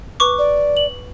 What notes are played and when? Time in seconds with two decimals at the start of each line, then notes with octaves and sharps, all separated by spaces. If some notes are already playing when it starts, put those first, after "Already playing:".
0.20 B4 C#6 D6
0.39 D5
0.77 F#7